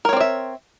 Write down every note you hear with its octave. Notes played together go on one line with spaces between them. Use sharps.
C4 A#4 C#5 D5 E5